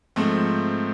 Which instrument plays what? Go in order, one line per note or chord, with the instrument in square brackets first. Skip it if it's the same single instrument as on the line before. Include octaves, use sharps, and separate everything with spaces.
[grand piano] G#2 F3 A3 C4